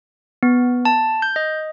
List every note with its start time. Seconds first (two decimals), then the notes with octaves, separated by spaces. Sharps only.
0.43 B3
0.85 A5
1.22 G6
1.36 D#5